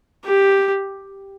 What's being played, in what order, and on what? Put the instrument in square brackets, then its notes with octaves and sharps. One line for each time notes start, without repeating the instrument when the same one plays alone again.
[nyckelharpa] G4